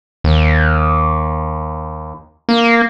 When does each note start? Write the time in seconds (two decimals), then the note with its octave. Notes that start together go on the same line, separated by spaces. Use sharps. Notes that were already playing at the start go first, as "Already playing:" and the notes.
0.24 D#2
2.49 A#3